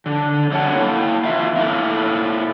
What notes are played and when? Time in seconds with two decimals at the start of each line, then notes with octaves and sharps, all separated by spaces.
0.06 D3
0.52 F#2 G3 A4 C#5 F#5 A5
0.75 A#3 E4
1.24 E3 F4 E5 F5
1.56 A#3 E4 A4